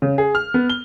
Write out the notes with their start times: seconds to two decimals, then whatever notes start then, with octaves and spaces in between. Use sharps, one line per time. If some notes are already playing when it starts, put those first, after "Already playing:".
0.02 C#3
0.18 G#4
0.35 F6
0.54 B3
0.70 G7